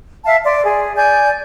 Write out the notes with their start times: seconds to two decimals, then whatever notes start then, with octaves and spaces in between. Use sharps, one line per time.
0.25 E5 F5 A5
0.44 D5 C6
0.64 G#4
0.97 D5 G#5 G6